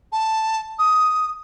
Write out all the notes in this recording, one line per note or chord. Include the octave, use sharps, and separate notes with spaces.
A5
D#6